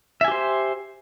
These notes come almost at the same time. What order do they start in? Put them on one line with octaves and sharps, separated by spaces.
E5 G#5 G4 C5